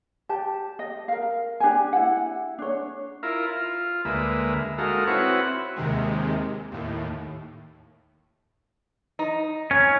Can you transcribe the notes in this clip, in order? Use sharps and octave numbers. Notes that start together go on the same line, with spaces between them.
G4 A5
D#5
A#4 F5
D4 G4 G5 G#5
E4 F#5
D4 C#5
E4 F4 A#4
F4
D2 G#3 A#3 B4 E5
G#3 D#4 F#4 A4 A#4 F5
C4 E4 F#4 B4 C#5 F#5
D#2 C3 D#3 G#3
D#2 A2
D#4
C#4